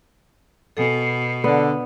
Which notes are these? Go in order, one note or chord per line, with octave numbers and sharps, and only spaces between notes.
B2 A4 G#5
D3 B3